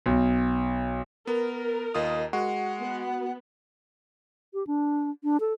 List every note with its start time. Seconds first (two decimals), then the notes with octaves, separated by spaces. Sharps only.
0.06 B1
1.27 B3 A#4
1.94 D#2 F4 D#5 D#6
2.33 G#3 F#4 F#5
2.80 B3
4.54 G4
4.67 D4
5.24 D4
5.40 A4